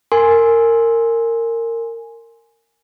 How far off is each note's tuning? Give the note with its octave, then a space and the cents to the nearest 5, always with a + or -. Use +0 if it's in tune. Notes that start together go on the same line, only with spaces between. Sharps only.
A#4 -20 G#5 +0 C6 +0